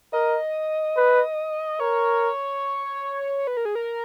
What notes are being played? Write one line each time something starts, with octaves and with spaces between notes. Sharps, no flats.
A#4 D#5
B4
A#4 C#5
B4
A#4
G#4
A#4